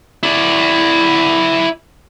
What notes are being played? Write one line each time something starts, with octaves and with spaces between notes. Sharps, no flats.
E4 D5